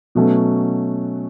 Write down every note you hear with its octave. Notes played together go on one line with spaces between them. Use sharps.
B2 F#3 A3 C#4